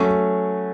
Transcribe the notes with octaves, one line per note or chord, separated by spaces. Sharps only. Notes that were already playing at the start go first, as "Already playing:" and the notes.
Already playing: F#3 A3 C#4